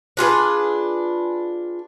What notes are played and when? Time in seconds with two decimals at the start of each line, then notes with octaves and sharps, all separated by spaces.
0.17 D4 F4 G#4 B4